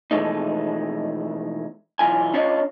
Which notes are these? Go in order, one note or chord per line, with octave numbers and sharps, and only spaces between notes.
B2 E3 F3 G#3 A3 D#4
B1 B2 E3 F4 G#5
C#4 D4 F4 C#5 D#5